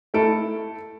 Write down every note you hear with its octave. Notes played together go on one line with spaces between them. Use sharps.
A3 E4 A4 D7